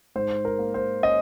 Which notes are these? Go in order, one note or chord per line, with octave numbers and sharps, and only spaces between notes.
G#2 C5
A#4
A#3
C5
C#4 D#5